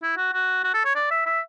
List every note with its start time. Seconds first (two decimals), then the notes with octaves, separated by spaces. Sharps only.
0.03 E4
0.17 F#4
0.34 F#4
0.64 F#4
0.74 A4
0.85 C#5
0.95 D5
1.11 E5
1.26 E5